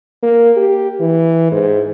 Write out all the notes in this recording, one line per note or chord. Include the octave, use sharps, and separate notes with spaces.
A#3
G4
E3
G#2